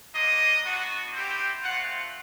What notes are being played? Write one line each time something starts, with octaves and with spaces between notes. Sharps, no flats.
A#3 D4 F4 D#5
B3 D4 F#4
C4 E4 G4
A3 C4 F4 F#5